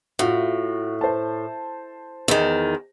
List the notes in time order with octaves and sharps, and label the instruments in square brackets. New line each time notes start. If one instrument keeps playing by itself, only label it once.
[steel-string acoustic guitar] A2 [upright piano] F4 F#4
[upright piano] C5 A5
[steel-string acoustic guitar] E2 D#3